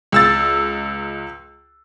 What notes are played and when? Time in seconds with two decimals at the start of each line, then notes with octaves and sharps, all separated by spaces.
0.12 C#2 E6 A6